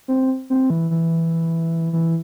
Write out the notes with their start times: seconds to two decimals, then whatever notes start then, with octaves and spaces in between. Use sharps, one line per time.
0.08 C4
0.50 C4
0.70 E3
0.91 E3
1.93 E3